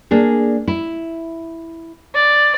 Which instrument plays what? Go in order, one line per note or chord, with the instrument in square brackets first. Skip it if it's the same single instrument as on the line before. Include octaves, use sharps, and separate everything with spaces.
[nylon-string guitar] A#3 D4 G#4
E4
[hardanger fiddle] D5